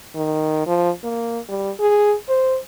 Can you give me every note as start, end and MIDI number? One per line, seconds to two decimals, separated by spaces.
0.16 0.66 51
0.67 0.90 53
1.04 1.39 58
1.49 1.71 55
1.80 2.15 68
2.29 2.57 72